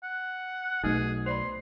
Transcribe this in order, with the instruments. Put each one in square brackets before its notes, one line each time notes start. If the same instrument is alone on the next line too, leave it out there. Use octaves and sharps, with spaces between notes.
[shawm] F#5
[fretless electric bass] B1 B2 [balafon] A3 D#4 [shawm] G#4
[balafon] C5 D5 B5 [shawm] C6